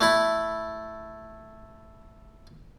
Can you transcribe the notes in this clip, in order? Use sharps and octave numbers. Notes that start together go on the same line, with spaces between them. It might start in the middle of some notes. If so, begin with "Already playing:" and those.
A3 E4 B5